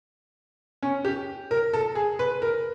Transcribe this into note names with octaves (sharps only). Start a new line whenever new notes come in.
C#4
G4
A#4
A4
G#4
B4
A#4